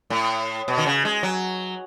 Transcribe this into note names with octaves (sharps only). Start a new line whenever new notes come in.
A2
B2
D#3
C#3
G#3
F#3